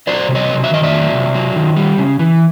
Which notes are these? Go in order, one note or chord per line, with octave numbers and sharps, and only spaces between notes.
F#3 C5 D5
C3
C#5 D#5
F#3
E5
D#3 D#5
D5 E5
F#3
C3
F#3
D#3
G3
C#3
E3